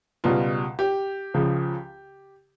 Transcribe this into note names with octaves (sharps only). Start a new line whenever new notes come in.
C#2 B2 G3 F4
G4
C#2 C#3 F3